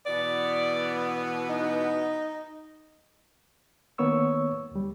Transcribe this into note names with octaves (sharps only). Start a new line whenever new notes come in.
B2 E3 B3 D5
D#4
D#3 A#3 B3 C#5 C#6 E6
D2 G3